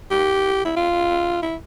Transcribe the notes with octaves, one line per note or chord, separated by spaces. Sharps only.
G4
E4
F4
E4